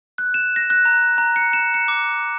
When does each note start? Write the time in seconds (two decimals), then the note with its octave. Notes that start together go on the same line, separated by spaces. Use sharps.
0.18 F#6
0.34 E7
0.56 A#6
0.70 F#6
0.85 A#5
1.18 A#5
1.36 C#7
1.53 E7
1.74 C#7
1.88 D6